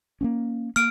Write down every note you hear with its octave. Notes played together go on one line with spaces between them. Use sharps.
A#3 B3 C#4
A#3 F6 D7